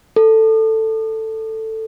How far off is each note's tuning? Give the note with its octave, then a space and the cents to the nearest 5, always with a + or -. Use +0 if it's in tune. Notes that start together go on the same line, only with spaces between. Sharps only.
A4 +10